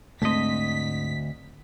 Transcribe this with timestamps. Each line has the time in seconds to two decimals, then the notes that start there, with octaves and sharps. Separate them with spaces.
0.22 D2 G#2 G#3 A3 C4 D#5 B6